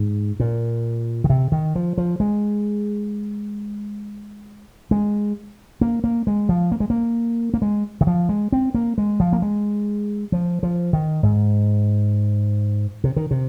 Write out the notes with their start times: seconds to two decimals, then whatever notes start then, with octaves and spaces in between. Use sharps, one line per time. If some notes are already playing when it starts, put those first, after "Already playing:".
Already playing: G#2
0.40 A#2
1.24 D#3
1.30 C3
1.52 D#3
1.76 F3
1.98 F3
2.20 G#3
4.91 G#3
5.81 A#3
6.04 A#3
6.27 G#3
6.49 F3
6.72 A#3
6.80 G#3
6.90 A#3
7.54 A#3
7.62 G#3
8.01 D#3
8.07 F3
8.29 G#3
8.52 C4
8.75 A#3
8.98 G#3
9.20 F3
9.33 A#3
9.42 G#3
10.32 F3
10.63 F3
10.93 D#3
11.23 G#2
13.04 C3
13.16 D#3
13.31 C3